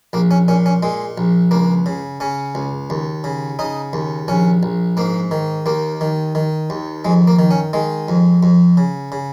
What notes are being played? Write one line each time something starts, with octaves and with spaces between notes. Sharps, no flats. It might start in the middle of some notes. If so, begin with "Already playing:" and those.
A#1 A#3
C#4
A#2 C#4
C#4
A#2 G#3
A#1
C#2 A#3
C#3
C#3 C#4
C#2
D#2
C#3
C#3 D#4
D#2
A#1 C#4
A#1
G#2 A#3
D#3
D#2 A#3
D#3
D#3
D#2
F2 G#3
A#3
D#3
C#4
D#3 G#3
F2
F2
C#3
C#3